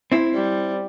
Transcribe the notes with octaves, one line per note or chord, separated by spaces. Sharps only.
C4 E4
G3